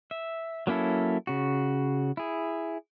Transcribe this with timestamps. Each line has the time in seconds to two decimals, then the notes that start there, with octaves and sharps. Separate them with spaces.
0.11 E5
0.67 F#3 A#3 C#4 E4 A4
1.27 C#3 F#4
2.17 E4 G#4